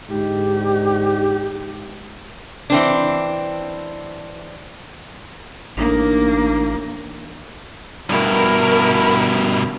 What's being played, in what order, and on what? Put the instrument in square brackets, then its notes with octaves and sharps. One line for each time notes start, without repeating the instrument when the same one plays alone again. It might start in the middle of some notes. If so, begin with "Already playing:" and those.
[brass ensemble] G#2 D3 D#4 [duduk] G4
[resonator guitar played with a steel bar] E3 C4 D4
[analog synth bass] A1 [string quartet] A#3 [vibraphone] D4 D#4
[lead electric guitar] G2 B2 [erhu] E4 [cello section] A#4